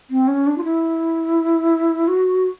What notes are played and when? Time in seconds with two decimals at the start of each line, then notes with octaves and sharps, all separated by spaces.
0.10 C4
0.28 C#4
0.47 D4
0.58 F4
0.64 E4
2.08 F#4